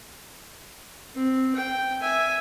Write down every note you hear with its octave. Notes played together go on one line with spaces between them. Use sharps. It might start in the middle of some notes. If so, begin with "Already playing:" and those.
C4
G5
E5 G#5